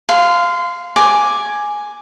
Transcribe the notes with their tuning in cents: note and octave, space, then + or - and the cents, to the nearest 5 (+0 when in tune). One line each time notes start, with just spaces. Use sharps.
F5 +0 C6 -25
G#5 +0 D6 +5